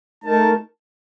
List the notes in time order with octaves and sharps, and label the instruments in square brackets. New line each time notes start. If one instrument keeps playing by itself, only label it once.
[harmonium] A3 D#4 A#4 [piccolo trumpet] A5